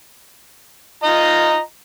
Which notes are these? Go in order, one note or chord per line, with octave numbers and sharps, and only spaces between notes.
F4 D#5 A#5